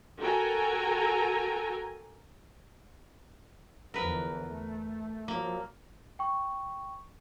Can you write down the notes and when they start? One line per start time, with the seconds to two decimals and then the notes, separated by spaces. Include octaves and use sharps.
0.22 F#4 A4 A#4 G5 G#5 A#5
3.94 E2 D3 F3 A#4 B4
4.45 A3
5.28 F3 F#3 A#3
6.19 G5 C#6